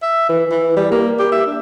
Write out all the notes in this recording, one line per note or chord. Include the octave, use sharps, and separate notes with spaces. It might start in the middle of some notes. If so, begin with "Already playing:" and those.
E5
E3
E3
G3
A#3
G4
E5
D4